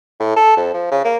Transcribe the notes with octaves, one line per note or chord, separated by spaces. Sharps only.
A2
A4
F2
F3
C#3
A#3